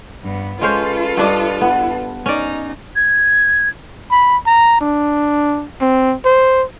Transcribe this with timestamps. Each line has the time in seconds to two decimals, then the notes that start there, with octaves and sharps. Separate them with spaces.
0.22 G2 B3
0.61 G#3 C#4 F4 A4 B4 C5
1.17 G2 D4 D#5
1.61 B3
2.26 C#4 D#4 D5
2.96 G#6
4.11 B5
4.46 A#5
4.81 D4
5.81 C4
6.25 C5